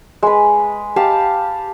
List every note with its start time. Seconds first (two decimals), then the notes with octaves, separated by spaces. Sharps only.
0.23 G#3 B4
0.96 G4 F5 A5